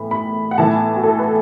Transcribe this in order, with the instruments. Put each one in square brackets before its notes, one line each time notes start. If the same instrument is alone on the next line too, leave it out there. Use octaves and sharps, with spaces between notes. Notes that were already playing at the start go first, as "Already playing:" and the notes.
Already playing: [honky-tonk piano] A2 E3 B5
B5
F#5
A2 E3 A5
F#4
A4
B4